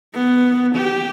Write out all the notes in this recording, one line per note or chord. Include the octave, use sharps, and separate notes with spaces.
B3
G4